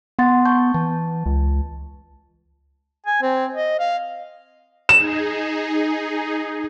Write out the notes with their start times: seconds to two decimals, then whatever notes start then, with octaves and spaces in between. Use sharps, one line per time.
0.19 B3 F#5 C6 A6
0.45 A5 C#6 G6
0.74 E3 A5
1.26 C#2
3.06 G#5
3.22 C4
3.55 D#5
3.80 F5
4.89 D#4 G#4 E7